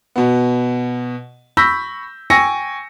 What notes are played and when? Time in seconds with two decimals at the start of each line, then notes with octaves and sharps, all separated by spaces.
0.16 B2 B3
1.57 B5 C#6 E6 G6 A#6 B6
2.30 G5 G#5 C#6 E6 A#6 C#7